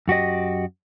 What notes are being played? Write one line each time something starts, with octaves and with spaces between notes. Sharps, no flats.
F#2 F#4 G4 D#5